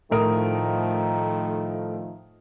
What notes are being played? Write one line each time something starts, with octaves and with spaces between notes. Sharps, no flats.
A2 D#3 F3 A3 A#4 D#6